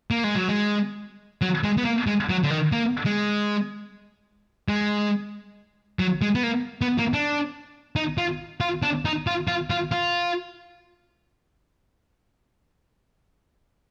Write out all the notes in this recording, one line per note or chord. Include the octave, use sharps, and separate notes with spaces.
A#3
G#3
F#3
G#3
F#3
G#3
B3
A#3
G#3
F#3
D3
D#3
A#3
G#3
G#3
F#3
G#3
B3
A#3
B3
A#3
D4
D#4
F4
F4
D4
D#4
F4
F4
F4
F4